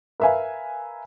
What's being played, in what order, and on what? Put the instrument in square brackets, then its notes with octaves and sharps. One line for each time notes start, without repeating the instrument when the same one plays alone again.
[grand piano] A#4 B4 E5 F5 G#5